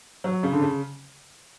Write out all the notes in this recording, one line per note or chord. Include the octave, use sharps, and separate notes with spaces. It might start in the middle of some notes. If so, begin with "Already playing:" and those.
F#3
C#3
D3
C#3